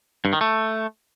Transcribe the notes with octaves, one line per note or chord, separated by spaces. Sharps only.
G2
D#3
A3